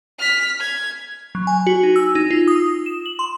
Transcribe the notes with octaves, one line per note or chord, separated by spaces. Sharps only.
F6 B6
G#6
F#3
G#5
F#4
D#4
E6
D#4
F4
D#6
E7
F#7
C6